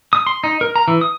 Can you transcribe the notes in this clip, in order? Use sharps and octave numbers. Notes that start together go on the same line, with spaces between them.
D#6
C6
D#4
A#4
A#5
E3
D#6